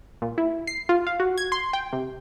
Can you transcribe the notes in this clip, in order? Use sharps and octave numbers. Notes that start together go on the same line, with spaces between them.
A#2
E4
C7
F4
F5
F#4
G#6
C6
G5
C3